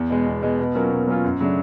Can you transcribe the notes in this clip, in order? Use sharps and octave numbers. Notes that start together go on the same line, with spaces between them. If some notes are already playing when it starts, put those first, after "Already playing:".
Already playing: E2
B2 G#3
E2
B2 G#3
B2
F#3 A#3 C#4 F4
B2
F#3 A#3 C#4 F4
F#2
C#3 F#3 A3 D4